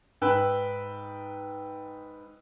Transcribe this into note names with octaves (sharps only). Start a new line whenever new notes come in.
G#2 B4 G5 E6 F#6